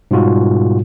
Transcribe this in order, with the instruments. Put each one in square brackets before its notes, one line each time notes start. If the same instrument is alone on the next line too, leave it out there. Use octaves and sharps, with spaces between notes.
[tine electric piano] G#2 B2 G3 F4 F#4